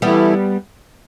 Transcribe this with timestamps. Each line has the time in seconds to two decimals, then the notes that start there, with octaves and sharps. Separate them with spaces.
0.02 E3 G3 A3 B3 E4